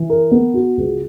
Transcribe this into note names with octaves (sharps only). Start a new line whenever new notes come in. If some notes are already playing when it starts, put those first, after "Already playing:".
Already playing: E3
A#4
B3
F#4
C#2